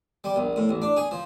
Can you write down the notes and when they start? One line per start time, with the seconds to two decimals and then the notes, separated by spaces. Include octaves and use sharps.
0.24 G3
0.36 A#1
0.56 A2
0.69 A1
0.82 D4
0.97 G#4
1.11 F3